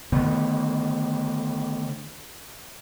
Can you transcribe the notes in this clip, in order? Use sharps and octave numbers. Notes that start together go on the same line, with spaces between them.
D3 D#3 A3 B3